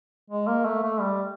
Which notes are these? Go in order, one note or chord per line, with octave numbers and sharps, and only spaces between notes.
G#3
A#3
A3
A3
G3